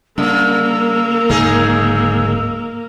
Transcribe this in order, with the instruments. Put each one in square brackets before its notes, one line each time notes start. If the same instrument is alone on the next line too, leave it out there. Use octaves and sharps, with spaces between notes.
[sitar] C#3 [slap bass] G3 [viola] A#3 A#4 [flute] E6
[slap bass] D1 G#2 C#3 [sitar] D#4 G#4